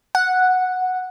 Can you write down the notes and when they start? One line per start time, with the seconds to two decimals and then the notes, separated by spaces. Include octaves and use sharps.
0.15 F#5